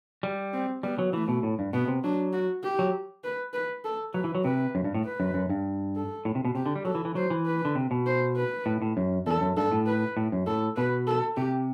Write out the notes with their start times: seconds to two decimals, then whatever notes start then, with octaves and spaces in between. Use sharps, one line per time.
0.23 G3
0.53 C4
0.83 G3 B3
0.99 F#3
1.13 E3 A3
1.28 B2
1.43 A2
1.59 G2
1.73 B2 B3
1.88 C3
2.04 F#3 D4
2.33 F#4
2.63 G4
2.79 F#3
3.24 B4
3.54 B4
3.85 A4
4.14 F#3 B4
4.24 E3
4.35 F#3
4.44 C3 B4
4.75 F#2
4.84 G2
4.94 A2
5.05 B4
5.20 F#2
5.34 F#2
5.50 G2
5.96 A4
6.25 A2
6.35 C3
6.45 B2
6.55 C3 G4
6.66 D3
6.76 G3
6.85 F#3 A4
6.95 E3
7.05 E3
7.15 F#3 C5
7.30 E3
7.46 B4
7.65 D3
7.75 C3
7.91 B2
8.06 C5
8.36 B4
8.66 A2
8.82 A2
8.97 F#2
9.26 E2 A4
9.41 F#2
9.57 G2 A4
9.72 A2
9.86 B4
10.17 A2
10.32 F#2
10.47 A2 A4
10.77 B2 B4
11.07 A4
11.37 C3 G4